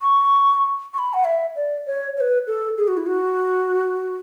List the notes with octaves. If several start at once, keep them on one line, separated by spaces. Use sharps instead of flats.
C#6
C#6
B5
F#5
E5
D5
C#5
C#5
B4
A4
G#4
F#4
E4
F#4